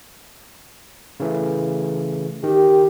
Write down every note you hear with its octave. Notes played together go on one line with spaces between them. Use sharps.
C#3 E3 A3
D#3 G4